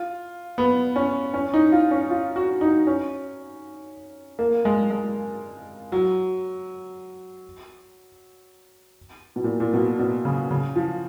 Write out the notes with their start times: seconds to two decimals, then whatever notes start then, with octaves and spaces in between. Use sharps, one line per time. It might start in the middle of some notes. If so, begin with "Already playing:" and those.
Already playing: F4
0.58 B3
0.96 C#4
1.34 C#4
1.54 D#4
1.72 F4
1.91 C#4
2.10 F4
2.36 F#4
2.61 D#4
2.87 C#4
4.39 A#3
4.65 G#3
4.90 G#3
5.92 F#3
9.36 B2
9.44 A#2
9.60 A#2
9.74 B2
9.99 B2
10.25 C#3
10.51 C#3
10.76 F3